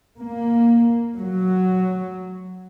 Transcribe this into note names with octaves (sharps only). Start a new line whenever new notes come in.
A#3
F#3